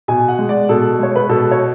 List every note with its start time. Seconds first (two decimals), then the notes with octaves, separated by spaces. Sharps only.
0.08 B2 G#5
0.28 F#5
0.39 G#3
0.49 D5
0.69 B2 A4
0.99 G#3 C#5
1.16 B4
1.29 B2 A4
1.51 C#5